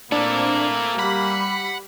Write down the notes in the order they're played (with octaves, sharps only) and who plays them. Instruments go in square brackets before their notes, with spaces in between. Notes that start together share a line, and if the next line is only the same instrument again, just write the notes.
[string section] A#2 C4 [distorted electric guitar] A3 E4 [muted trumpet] A#3 [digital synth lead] D4
[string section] G3 [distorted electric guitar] F#5 [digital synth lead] B5